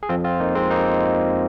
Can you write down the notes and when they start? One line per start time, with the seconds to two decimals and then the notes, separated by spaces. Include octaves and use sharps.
0.03 G#4
0.09 F2 F3 C4 F4
0.24 C4 F4
0.40 A#3 D#4
0.55 G#3 C4
0.70 A#3 D#4